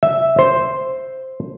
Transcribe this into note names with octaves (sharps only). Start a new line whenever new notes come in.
E5
C5